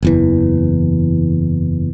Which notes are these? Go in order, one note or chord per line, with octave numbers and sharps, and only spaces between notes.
F#1 E2 E3